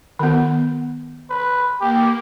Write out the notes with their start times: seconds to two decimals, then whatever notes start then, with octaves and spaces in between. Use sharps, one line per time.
0.19 D#3 B3
1.30 B4
1.81 A#3 G4